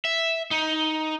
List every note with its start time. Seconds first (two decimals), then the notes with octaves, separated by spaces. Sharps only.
0.05 E5
0.51 D#4